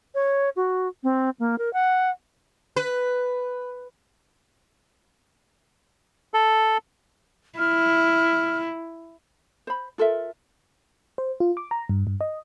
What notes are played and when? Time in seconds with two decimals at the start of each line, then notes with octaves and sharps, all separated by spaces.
0.15 C#5
0.56 F#4
1.03 C4
1.40 A#3
1.58 A#4
1.73 F#5
2.76 B4
6.34 A4
7.59 E4 F6
9.67 C5 B5
9.98 F4 A4 A#4 E5
11.18 C5
11.40 F4
11.57 D6
11.71 A#5
11.89 G2
12.07 G2
12.21 D#5